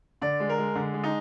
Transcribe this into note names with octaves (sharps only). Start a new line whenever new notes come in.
D3 D5
G#3
A#4
G#3
D3
G#3
D#4